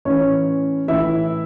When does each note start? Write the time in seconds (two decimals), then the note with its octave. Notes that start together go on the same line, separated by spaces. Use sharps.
0.05 A2 E3 C#4 C#5
0.88 A2 E3 E4 E5